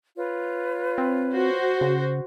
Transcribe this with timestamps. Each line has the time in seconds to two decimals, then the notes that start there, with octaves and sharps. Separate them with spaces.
0.16 F4 B4 C#5
0.98 C4
1.34 F#4 C5
1.81 C#3